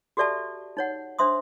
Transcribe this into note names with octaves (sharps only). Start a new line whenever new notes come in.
F#4 G4 A4 D5 E5 A5
D#4 C#5 F#5
D4 C5 E5 C6 D#6